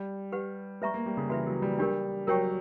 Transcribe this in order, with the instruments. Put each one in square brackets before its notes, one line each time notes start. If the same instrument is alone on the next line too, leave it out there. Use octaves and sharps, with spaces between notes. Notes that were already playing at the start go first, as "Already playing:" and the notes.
Already playing: [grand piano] G3
[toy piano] G4 B4 F#5
[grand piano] G3 [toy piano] B4 E5 A#5 C#6
[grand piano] A#3
G3
C#3
[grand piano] E3 [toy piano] F#4 B4 E5
[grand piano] F#3
G3
[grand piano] G3 [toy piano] D4 G4 A#4
[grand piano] F#3 [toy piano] A#4 C#5 G5 C#6